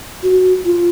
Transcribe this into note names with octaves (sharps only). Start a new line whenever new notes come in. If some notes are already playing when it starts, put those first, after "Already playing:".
F#4
F4